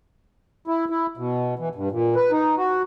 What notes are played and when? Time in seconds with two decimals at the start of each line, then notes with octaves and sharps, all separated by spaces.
0.67 E4
0.90 E4
1.17 B2
1.59 E3
1.75 G2
1.91 A#2
2.15 B4
2.31 D#4
2.58 F#4